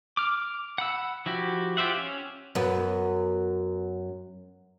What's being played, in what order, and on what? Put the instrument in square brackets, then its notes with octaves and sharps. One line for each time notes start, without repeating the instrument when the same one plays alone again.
[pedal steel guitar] D6 F6
F#5 B5 E6
F3 E4 F#4 G4
F4 G4 C5 E5 F#5
C#4
[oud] F#2 B3